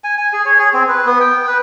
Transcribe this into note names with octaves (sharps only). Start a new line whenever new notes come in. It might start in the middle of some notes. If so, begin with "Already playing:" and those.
G#5
G#5
G#4
C#5
G#4
C4
B4
B3
G5
B4